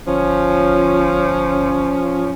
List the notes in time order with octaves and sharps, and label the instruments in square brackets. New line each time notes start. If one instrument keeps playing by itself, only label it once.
[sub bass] G1 [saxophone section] F3 C#4